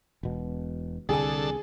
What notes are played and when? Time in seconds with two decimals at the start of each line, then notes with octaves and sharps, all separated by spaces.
0.23 E1 B2
1.09 C2 D3 G#4 A4 G#5